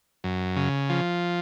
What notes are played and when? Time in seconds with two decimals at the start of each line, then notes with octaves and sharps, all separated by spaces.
0.24 F#2
0.56 C#3
0.89 F3